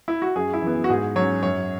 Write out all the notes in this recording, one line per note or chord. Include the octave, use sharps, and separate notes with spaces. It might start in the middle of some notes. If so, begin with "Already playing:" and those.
E4
F#4
F#2 G#4
E4
E3 B3
F#4
G#2 G#4
F#3 C#4 C#5
F#2 C#5